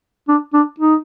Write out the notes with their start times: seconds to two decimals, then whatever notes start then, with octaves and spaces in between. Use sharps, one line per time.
0.28 D4
0.54 D4
0.80 D#4